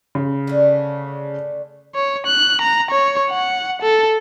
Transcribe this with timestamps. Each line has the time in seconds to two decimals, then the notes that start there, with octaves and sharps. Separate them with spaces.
0.15 C#3
0.47 D3 A3
1.95 C#5
2.26 F#6
2.61 A#5
2.91 C#5
3.30 F#5
3.82 A4